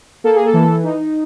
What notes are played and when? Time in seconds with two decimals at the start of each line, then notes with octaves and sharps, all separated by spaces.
0.24 A#3 A4
0.35 G#4
0.46 A4
0.53 E3
0.84 D#4